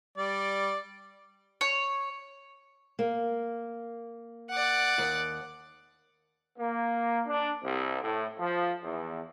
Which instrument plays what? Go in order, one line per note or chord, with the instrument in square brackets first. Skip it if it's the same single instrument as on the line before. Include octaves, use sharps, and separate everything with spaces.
[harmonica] G3 D5
[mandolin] C#5
[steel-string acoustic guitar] A#3
[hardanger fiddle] D5 F#5
[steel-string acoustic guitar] D#2
[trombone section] A#3
D4
C2
A2
F3
E2